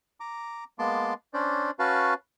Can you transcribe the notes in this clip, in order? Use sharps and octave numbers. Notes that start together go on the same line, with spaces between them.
A#5 D6
G#3 A#3 B3 A5 C6 D6
C#4 D4 C5 D5
C#4 F#4 B4 F5 A5